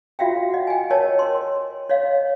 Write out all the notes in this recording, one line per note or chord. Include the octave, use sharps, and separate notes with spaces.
F4 F#4 E5 F5 G5
D#5 F#5
G5 G#5
A#4 C#5 D#5 G5 A5
A#4 C6
C#5 D#5 F5